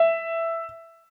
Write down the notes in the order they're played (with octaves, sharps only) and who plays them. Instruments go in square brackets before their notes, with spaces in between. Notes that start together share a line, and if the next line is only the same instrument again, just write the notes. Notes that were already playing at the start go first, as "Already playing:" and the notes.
Already playing: [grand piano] E5